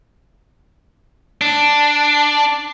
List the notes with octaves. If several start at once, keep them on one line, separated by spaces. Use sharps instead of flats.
D4